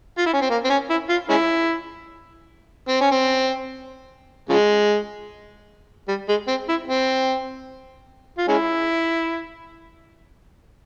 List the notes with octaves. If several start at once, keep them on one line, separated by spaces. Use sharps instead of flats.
F4
E4
C#4
C4
A#3
C4
C#4
E4
F4
G#3 C#4 E4
C4
C#4
C4
C#3 F3 G#3
G3
G#3
C4
E4
C4
F4
G#3 C#4 E4